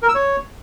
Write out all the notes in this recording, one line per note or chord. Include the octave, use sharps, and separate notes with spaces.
A#4
E6
C#5